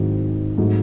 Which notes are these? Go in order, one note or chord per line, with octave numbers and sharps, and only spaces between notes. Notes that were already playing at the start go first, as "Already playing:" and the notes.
Already playing: G#2 D#3 F#3 C4 E4
G#2 F#3 A3 C4 D#4